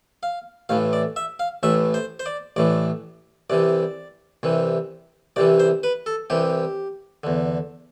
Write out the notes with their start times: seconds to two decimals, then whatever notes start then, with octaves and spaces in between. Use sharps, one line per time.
0.23 F5
0.69 A1 A2 E3 F5
0.93 D5
1.16 E5
1.40 F5
1.63 A1 A2 E3 E5
1.94 C5
2.20 C5
2.26 D5
2.56 A1 A2 E3 D5
3.50 C2 C3 E3 D5
4.43 C2 C3 E3
5.36 C2 C3 E3 D5
5.60 C5
5.83 B4
6.06 A4
6.30 C2 C3 E3 G4
7.24 E2 D3